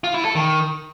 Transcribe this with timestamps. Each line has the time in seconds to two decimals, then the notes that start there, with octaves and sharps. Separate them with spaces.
0.04 F4
0.14 E4
0.25 A4
0.35 D#3